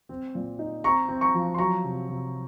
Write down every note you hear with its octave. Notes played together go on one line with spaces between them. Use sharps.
C4
A#2
D#4
C4 A#5 C#6
C4
A#5 C#6
F3
C6
F#3 A#5 C#6
C3
C3